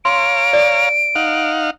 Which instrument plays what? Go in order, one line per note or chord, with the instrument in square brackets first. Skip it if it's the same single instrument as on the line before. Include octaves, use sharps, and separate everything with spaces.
[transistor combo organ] C#5 F5 A#5 [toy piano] C6 [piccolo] D7
[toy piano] D5
[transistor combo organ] D#4 F5 F#5